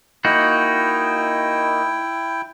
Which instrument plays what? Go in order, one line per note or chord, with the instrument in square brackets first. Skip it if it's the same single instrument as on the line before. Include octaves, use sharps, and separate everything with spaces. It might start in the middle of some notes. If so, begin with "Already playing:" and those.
[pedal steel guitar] A#3 D#4 F#4 [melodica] E4 G5